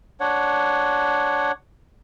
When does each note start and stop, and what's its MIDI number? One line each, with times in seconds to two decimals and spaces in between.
0.20 1.52 62
0.20 1.52 73
0.20 1.52 78